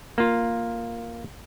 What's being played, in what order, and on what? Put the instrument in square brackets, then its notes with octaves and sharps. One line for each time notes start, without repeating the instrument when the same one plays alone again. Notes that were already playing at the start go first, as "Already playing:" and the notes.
[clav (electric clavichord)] A#3 F4